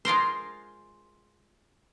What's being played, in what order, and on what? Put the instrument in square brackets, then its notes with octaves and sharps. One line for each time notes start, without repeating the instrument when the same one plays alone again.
[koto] G#3 F4 A#4 C5